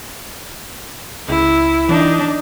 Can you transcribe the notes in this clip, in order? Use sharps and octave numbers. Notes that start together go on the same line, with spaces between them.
C#2 E4
E3 D4 D#4